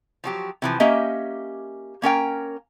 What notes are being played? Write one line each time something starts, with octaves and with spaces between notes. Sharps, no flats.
F3 F#3 G4
C3 E3 F3
A#3 C#4 G4 D#5 E5
A#3 C#4 A#4 G5